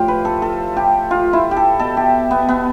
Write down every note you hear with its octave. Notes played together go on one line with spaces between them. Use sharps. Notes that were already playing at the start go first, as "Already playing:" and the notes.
Already playing: A2 F3 F4 G4
B4
A4
A4
G4
F4
E4
G4
A4
B2 A4
G4
B3
B3